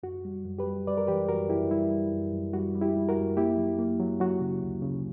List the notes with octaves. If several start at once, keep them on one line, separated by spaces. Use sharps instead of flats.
F#2 F#4
G3
F#2
G4 B4
G3
G3 B4 D5
A#4
E3 G4 B4
F#2 F#4 A#4
F#2 E4 G4
G3 E4
G3
F#2
F#2
G3 F#4
G3
E4 G4
G3
F#4 A#4
F#2
A#3 E4 G4
F#3
A#3
F#3
F#3 F#4
C#3
D2
C#3